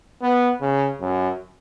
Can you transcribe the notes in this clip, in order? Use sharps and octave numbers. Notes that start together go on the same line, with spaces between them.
B3
C#3
F#2